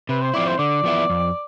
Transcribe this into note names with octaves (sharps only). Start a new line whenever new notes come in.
C3 B4
C5
F3 C4 E4 D5
C5
D3 D5
F3 B3 E4
F2